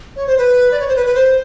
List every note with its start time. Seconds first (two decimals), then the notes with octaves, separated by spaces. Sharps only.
0.16 C#5
0.27 C5
0.37 B4
0.71 D5
0.80 C#5
0.88 C5
0.96 B4
1.06 B4
1.15 C5